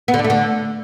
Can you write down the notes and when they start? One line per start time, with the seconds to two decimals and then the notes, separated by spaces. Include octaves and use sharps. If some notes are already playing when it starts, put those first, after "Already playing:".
0.08 B3
0.14 D3
0.19 D4
0.24 A3
0.30 D3